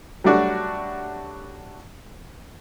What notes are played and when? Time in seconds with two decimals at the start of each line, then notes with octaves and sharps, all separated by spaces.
0.24 F#3 G3 A3 D4 F#4